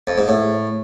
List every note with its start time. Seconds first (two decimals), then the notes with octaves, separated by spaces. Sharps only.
0.07 F2
0.18 G#2
0.28 A2